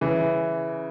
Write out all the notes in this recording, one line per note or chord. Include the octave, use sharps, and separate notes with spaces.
C#3 E3